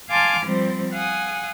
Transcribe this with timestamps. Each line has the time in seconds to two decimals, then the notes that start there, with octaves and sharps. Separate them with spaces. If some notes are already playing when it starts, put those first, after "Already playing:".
0.10 F5 G#5 A5 C6 D6 F6
0.46 F3 G3 C4 C5
0.92 F5 F#5 G#5 D#6